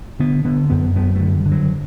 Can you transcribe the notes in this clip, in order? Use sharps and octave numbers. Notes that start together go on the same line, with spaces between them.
D3 B3
D3 B3
F#2 B3
F#2 B3
A3
D3
G3
D3
F#3